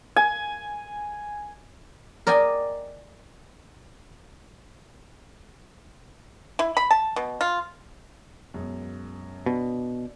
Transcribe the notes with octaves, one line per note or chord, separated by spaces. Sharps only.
G#5
A#4 D5 D#5 G5 G#5
E4
B5
A5
B2
F4
F#2 B2 G#3
B2 D4